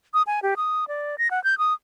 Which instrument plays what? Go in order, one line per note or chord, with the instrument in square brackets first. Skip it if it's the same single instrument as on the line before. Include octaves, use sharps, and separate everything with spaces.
[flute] D#6
G#5
G4
D#6
D5
A#6
F#5
G6
D#6